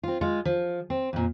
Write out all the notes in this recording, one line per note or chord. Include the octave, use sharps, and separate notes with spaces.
C4 F4
G#3 F4
F3
C4
F2 A#2